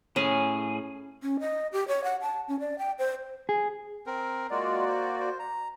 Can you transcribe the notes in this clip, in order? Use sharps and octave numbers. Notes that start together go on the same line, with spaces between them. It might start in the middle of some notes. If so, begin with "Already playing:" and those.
A2 C#4 G#4
C#4
D#5
G4
C#5
F#5
A5
C#4
D5
G5
C5
G#4
C4 A#4
G#3 A#3 F4 F#4 D5
C5
C5
A#5